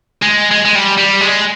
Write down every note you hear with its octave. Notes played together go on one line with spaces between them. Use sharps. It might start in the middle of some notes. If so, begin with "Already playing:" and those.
G#3
G#3
G#3
G3
G3
G#3